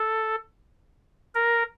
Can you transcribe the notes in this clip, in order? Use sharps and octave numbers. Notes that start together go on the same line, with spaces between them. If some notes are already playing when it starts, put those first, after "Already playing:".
Already playing: A4
A#4